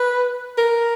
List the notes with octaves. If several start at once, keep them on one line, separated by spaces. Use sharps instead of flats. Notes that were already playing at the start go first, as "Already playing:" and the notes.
Already playing: B4
A#4